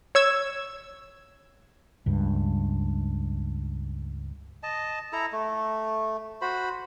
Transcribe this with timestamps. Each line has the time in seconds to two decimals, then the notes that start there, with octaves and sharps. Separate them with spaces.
0.15 C#5 E6 G#6
2.06 C#2 G2
4.63 D#5 A5
5.13 E4 A4 A#5
5.32 A3
6.41 F#4 C5 B5